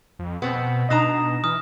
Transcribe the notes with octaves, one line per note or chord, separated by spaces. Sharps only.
F2
B2 B3 C4
B2 D4 D#4 A#5 D#6 A#6 E7
E3 D#6 F6